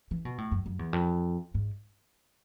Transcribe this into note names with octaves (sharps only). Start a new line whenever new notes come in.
E3
B2
A2
F#2
F#2
E2
F2
G#2